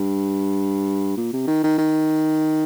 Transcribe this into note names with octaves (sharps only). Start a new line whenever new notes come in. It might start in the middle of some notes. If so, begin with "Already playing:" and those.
Already playing: G2
A#2
C3
D#3
D#3
D#3